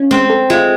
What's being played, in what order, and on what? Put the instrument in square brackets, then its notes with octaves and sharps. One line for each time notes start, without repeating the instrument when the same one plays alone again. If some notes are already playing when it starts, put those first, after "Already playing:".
Already playing: [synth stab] C#4 F4
[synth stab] G#3 [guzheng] C4
[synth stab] A4
[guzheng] G#3 [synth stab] F4